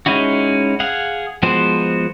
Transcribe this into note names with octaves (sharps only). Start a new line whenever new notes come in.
G#3 C#4 D#4 E4 F#4
G#4 F5 F#5
F3 G#3 B3 F#4 C5